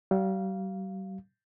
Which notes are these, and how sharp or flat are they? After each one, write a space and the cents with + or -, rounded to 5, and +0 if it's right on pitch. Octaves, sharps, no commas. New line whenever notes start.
G3 -40 F5 -5